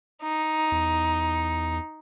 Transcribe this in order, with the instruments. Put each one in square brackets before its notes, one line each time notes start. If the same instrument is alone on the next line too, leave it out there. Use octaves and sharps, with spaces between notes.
[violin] D#4
[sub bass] E2